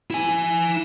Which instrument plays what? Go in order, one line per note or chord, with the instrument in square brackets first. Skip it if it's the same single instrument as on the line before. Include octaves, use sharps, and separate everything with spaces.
[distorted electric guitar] E4 G#5